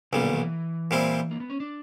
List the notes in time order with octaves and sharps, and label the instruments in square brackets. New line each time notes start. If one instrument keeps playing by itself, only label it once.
[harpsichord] B1 A#2 G3 [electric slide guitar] C#3
[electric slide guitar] D3
D#3
E3
[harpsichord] A#2 G3 C4 E4
[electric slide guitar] A#3
B3
C#4
D4